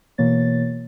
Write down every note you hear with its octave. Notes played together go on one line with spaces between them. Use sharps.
B2 E3 A#3 C#5 A6